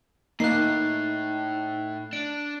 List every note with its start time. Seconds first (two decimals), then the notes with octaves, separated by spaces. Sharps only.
0.40 A2 A#3 D#4 F#6 C7
2.13 D4 D7